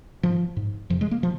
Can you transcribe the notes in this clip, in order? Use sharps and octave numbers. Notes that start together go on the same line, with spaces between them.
G#2 F3
G#2
F2 C3 F3
G#3
A#3
C3 F3